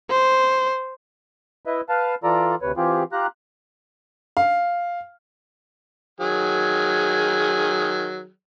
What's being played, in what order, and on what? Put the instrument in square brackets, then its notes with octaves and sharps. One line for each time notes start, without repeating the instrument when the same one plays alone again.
[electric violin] C5
[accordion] E4 B4 D#5 E5
B4 F5 A5
E3 F4 A4 D5 A#5
D2 C3 B4 C#5
E3 C4 F4 G4 G#4
F4 G4 A#5 F#6
[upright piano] F5
[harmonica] D#3 F#3 G#4